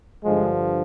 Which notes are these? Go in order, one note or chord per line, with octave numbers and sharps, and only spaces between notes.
G2 D3 F3 G#3